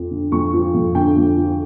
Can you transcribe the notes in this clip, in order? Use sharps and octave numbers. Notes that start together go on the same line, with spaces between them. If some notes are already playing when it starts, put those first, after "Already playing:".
Already playing: F2 F3
D3
F2 C#6
F3
F2
D3 G5
F2
F3